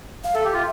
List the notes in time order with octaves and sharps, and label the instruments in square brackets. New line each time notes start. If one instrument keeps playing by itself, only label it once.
[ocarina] F5
[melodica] A4 [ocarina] E5
[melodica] G4
F4